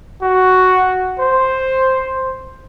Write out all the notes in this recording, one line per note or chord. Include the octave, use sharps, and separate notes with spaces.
F#4
C5